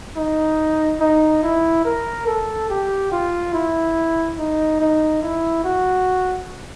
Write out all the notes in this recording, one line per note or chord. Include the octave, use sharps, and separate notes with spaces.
D#4
D#4
E4
A#4
A4
G4
F4
E4
D#4
D#4
E4
F#4